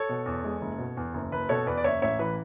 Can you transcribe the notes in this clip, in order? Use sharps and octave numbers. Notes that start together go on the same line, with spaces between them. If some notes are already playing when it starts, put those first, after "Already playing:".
Already playing: A4 C#5
B2
E2
G#3
F#1
B2
E2
F#1
F#1 B4
B2 A4 C#5
E2 B4 D5
D5
F#1 C#5 E5
A1 C#5 E5
E3 B4